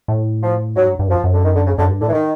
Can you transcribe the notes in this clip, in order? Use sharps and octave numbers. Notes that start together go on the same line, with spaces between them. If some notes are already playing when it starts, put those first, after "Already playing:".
A2
F3
G#2 F#3
G2
G2
F#2 F3
F#2
D3
D#3
D3
C#3
F#2 D3
G2
A2 D3
E3
D#3